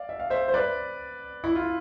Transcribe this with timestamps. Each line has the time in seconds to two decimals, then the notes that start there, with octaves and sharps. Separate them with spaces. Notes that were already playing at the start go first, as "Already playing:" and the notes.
Already playing: D5 F5
0.09 E5
0.20 F5
0.30 C5 E5
0.48 C5
0.54 B4 D5
1.44 E4
1.55 F4